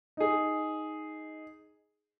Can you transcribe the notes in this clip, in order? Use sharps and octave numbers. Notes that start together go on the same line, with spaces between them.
D#4 G#4